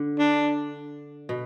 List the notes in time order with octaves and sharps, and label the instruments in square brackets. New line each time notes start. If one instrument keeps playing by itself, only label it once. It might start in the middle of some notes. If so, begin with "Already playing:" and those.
Already playing: [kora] D3
[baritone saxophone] D4
[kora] B2